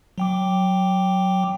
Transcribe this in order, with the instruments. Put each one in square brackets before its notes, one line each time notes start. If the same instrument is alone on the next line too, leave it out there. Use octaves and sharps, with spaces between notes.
[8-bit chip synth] F#3 G5 D6